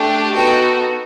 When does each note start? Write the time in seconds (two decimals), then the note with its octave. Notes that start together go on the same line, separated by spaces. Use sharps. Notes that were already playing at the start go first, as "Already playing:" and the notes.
Already playing: A3 D4 G4
0.34 B3 D#4 F#4 A4 G5